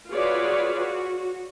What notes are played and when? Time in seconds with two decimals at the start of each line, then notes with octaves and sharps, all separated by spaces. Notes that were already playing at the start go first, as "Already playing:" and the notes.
0.11 F4 F#4 G#4 B4 C#5 D5
0.79 F#4